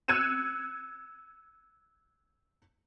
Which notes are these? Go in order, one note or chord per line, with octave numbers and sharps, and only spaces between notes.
E6 F#6 G#6 C#7 D#7 E7